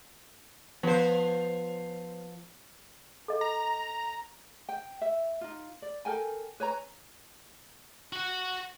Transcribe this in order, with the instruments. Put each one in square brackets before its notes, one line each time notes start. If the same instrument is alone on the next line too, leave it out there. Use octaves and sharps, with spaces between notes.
[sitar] F3 C5 [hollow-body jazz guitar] B3
[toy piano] A4 D#5
[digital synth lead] A#5
[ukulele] G5
E5
D#4 F4
D5
A4 A#4 G5 G#5
B4 C#5 G#5 A#5
[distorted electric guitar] F#4 F#5